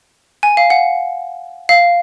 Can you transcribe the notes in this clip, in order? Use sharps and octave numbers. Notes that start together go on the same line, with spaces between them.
G#5
F5
F#5
F5